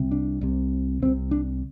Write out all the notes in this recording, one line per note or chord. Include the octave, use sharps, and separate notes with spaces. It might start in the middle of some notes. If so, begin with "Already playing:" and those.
Already playing: C2 C3
D4
C2 C3
C2 C3 C4
D4